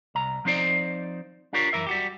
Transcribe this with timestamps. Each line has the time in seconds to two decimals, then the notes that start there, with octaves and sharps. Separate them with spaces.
0.15 C2 A#5
0.45 F3 C4 D#4 C5 D5
1.53 D4 F4 G4 A#4 C#5
1.73 F#2 E3 A#4 E5
1.87 G3 F#4 G4